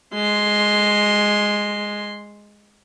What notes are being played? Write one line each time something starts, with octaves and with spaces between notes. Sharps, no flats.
G#3 C6